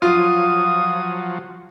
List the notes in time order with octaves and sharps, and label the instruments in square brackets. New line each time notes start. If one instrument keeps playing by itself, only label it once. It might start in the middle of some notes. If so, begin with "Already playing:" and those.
[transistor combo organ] F3 F#3 [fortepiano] F4 [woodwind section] C#5 F5 D#6